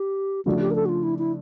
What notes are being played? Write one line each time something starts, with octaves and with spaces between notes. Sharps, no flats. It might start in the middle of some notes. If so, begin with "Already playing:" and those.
Already playing: G4
C#3 F3 A3 D4 F#4
G4
A#4
A4
F#4
F4
E4
E4